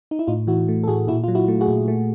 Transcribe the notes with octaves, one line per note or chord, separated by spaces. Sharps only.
D#4
E4
A2 D#4 F4
E3 E4 F#4
A3
A4
A2 F#4 G#4
A#2 E4 F#4
F#3 F4
E4 F#4
A3
F#4 G#4
A#2
A3